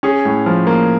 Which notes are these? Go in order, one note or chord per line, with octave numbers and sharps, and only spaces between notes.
C#4 G#4
A2
F3
A#3